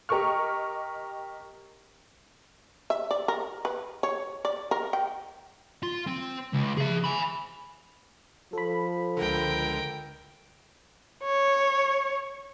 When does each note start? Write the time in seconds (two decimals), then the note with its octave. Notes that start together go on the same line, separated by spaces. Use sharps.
0.09 G4 A#4 D#5 C#6 F6
2.90 E5
3.11 D5
3.28 A#4
3.65 B4
4.03 C#5
4.45 D5
4.71 A#4
4.93 G5
5.83 F4
6.07 C4
6.54 C#2
6.78 G#4 E5
7.04 G#5 B5
8.53 F3 A4 B5
9.17 C#2 D3 A#4 G5
11.24 C#5